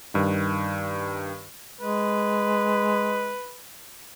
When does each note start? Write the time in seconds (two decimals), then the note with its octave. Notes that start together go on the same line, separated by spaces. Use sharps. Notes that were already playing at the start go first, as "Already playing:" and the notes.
0.14 G2 D#3
1.81 G#3 B4